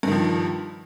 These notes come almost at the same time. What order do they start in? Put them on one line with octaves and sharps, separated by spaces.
G2 D#3 F3